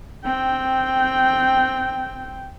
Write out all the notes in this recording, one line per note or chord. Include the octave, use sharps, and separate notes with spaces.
C4 G5